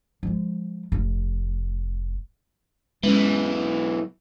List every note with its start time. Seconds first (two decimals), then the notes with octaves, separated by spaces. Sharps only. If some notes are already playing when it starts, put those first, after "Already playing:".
0.23 F3 G#3
0.92 F1
3.03 B1 E3 G#3 C4 C#4